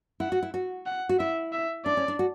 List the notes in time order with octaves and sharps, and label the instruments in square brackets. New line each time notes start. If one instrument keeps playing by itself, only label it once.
[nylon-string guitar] E4 [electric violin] F#5
[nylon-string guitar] F#4
E4
F#4
[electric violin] F#5
[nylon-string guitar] F#4
[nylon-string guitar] E4 [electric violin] E5
[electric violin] E5
[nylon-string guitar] D4 [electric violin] D5
[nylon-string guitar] C#4
D4
F#4